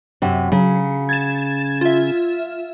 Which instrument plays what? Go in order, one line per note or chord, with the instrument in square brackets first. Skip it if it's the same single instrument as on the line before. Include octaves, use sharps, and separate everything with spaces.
[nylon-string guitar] F#2 C3
[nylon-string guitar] C#3 [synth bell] F#3
[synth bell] G#6 A6 E7
F4 E5